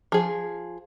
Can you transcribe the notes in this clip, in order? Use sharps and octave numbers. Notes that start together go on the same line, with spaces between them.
F3 G#4